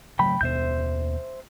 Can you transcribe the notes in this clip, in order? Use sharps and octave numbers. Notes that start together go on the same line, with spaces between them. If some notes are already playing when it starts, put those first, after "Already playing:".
C#3 F#3 A3 G5 B5
D#2 B2 B3 C5 E5 G6